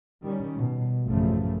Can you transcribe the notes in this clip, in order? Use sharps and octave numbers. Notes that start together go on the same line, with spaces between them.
D#3 G3 C#4
B2
A1 F#2 C#3 F3 A3